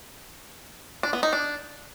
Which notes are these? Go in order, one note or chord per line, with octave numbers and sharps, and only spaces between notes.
D4
B3
D#4
D4